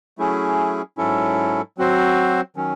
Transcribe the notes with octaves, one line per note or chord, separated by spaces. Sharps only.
F#3 A3 C#4 E4 G#4
G#2 F#3 C#4 E4 A4
F#3 C4 F#4 C5
D#3 F#3 C#4